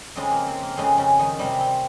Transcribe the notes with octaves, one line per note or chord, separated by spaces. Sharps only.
F2 C#3 G#3 C4
A#3
C4
A#3
F2 C#3 G#3 C4
C#3 C#4
D#3 D#4
C3 G3 C4
C4